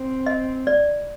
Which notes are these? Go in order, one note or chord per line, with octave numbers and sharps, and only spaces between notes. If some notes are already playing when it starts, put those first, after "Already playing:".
Already playing: C4
D#5
D5